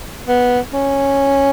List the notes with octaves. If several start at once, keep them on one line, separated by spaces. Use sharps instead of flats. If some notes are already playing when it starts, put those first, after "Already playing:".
B3
C#4